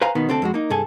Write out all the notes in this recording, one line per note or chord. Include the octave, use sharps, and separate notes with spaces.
B4 C5 F5 G#5 A#5
B2 D#3 B3
D2 C4 D4 A4
F2 G#3 F#4
A#3 D#4
C2 G2 G#4 A4 G#5